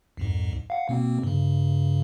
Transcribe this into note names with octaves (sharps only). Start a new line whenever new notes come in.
C2 F2 G#2
F5 F#5
B2 A#3 C4
G2 C#3